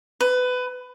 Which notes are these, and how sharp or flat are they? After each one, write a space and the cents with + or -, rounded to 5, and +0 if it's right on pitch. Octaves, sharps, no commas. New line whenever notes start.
B4 +20